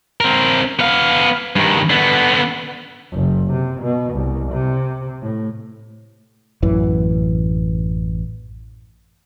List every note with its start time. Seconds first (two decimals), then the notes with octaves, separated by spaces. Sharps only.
0.20 C4 A#4
0.79 B3 F5
1.56 G2 D#3
1.90 D3 B3
3.13 F#1
3.53 C3
3.83 B2
4.14 C2
4.52 C3
5.22 A2
6.62 A1 F#2 E3